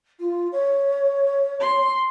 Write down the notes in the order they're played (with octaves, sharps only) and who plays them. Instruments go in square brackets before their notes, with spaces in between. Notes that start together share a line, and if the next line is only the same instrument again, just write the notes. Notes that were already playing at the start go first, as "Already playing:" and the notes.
[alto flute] F4
C#5
[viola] C6